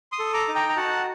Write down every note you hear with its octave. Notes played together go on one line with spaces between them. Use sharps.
C6 D#6
A4
A#5 D6
D#4
G5 A#5
A#5
F#4 F#5 A5